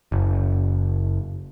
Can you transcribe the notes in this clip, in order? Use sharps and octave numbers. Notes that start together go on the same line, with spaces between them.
F#1